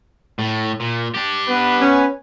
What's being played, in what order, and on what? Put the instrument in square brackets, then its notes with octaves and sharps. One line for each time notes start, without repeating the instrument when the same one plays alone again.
[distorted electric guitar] A2
A#2
D4 G4
[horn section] B3 B4
[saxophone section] C#4